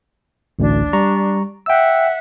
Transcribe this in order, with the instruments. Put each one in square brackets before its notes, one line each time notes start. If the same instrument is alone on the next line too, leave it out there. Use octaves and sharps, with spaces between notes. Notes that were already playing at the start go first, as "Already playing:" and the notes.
[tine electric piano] A1 D2 [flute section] D4
[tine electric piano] G3 A#5 C#6
[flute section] E5 F#5 [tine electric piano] G5 E6